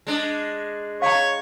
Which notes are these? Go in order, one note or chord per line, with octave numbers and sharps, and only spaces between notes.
G#3 D4
C#5 F5 A#5